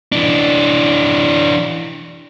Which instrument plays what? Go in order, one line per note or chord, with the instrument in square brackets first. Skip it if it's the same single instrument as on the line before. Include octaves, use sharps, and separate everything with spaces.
[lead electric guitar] E3 D4